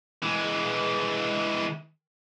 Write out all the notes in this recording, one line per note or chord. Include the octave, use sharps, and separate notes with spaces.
E3 G#3